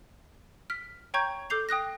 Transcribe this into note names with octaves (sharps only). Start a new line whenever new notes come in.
F6 B6
C#5 G5 A#5 C#6 G6 G#6
A4 D6 G6 C7 F7
G5 D#6 F#6 A#6